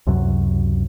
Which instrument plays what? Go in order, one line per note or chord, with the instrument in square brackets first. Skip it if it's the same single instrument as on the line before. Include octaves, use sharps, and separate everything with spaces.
[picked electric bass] C#2 F#2 C3 F#3